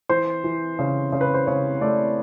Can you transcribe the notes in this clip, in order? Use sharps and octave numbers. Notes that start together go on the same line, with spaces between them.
E3 C5
E3
C#3
C#3
B4
C5
C#3 C#5
A3 D5